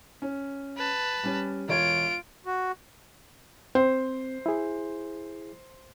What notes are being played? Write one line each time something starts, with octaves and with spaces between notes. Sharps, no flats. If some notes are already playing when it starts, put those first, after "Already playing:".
C#4
B4 A5
G3 C#4
E1 F4 C#5 G#6 D7
F#4
C4 C5
E4 G#4